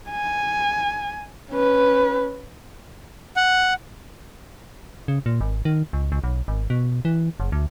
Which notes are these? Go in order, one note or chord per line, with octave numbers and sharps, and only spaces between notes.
G#5
C#4 B4
F#5
C#3
A#2
G#1
D#3
C#2
C#2
B1
G#1
B2
E3
F#1
D2